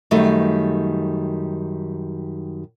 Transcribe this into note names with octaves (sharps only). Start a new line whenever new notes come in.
F#2 D#3 G3 A3